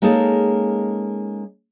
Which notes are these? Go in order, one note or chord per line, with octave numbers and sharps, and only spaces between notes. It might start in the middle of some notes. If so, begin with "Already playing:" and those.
G#3 A#3 C#4 D#4 G#4 A4